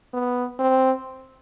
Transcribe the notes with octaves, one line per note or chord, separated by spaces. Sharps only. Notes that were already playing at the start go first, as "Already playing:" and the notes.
B3
C4